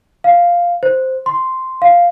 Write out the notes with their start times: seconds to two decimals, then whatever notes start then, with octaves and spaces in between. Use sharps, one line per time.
0.24 F5
0.83 C5
1.26 C6
1.82 F5